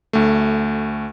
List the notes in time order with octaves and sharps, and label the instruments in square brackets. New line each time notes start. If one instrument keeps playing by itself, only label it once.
[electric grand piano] D2 A3